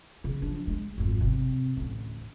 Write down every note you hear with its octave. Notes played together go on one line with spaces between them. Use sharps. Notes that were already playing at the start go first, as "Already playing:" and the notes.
C#3
F3 D4
G#3
G#1 F2
C3
A1 D2